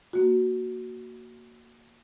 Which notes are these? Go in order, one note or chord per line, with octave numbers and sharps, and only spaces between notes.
A#3 F#4